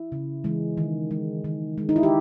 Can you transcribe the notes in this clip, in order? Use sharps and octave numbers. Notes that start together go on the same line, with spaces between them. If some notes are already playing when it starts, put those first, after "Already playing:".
Already playing: E4
C#3
E3 G#3
D#3
G#3
D#3
G#3
D#4
E4
G4